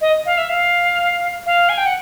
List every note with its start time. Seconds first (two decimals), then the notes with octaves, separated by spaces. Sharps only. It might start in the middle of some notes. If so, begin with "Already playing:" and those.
0.01 D#5
0.26 F5
0.38 E5
0.49 F5
1.46 F5
1.69 G#5
1.77 G5
1.86 F#5